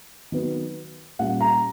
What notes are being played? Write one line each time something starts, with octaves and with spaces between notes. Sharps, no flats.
D#3 F#3 B3
A#2 G3 A#3 C#4 F#5
A#5